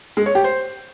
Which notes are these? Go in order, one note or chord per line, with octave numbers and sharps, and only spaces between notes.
G#3
C#5
G4
C5